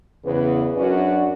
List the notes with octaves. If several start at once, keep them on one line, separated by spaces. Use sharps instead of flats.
E2 C#3 B4
F#2 C#4 D4 F#4 D5